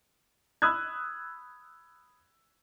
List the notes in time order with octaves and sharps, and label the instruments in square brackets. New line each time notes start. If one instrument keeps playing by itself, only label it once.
[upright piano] B5 D#6 E6 F#6 G#6